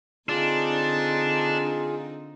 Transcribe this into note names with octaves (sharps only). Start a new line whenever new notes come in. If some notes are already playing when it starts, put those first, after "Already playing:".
D3 C4 D4 D#4 F4 G#4